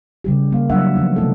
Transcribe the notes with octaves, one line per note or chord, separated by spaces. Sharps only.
C#3 G3 G4
G3 A#3 F5
E3 F#3 G3 D4 E5 F#5
D#3 F3 B3 D#4
C3 G3 A3 B3 D#4 A4